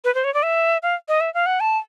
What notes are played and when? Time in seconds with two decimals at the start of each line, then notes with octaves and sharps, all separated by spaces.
0.05 B4
0.15 C5
0.24 C#5
0.34 D5
0.43 E5
0.83 F5
1.08 D#5
1.21 E5
1.34 F5
1.46 F#5
1.60 A5